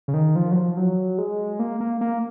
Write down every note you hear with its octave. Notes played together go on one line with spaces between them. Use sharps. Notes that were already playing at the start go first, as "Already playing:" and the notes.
C#3
D#3
F3
F#3
F3
F#3
G#3
A#3
A#3
A#3